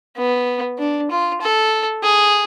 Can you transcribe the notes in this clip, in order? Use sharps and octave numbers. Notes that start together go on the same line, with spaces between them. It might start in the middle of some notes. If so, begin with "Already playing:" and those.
B3
D4
F4
A4
G#4